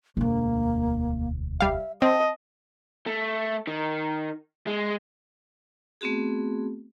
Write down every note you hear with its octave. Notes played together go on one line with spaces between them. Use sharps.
E1 D2 A#3
G3 E5 F5
C4 D#5 A5
A3
D#3
G#3
A3 B3 C4 F#4 G#4